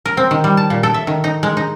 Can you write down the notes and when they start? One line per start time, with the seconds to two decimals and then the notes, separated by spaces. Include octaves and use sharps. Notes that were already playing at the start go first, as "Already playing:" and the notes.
0.06 A#4
0.17 C4
0.31 D#3
0.44 G3
0.57 A5
0.70 A#2
0.83 A4
0.94 E5
1.07 D#3
1.24 D#4
1.43 G#3
1.57 D#4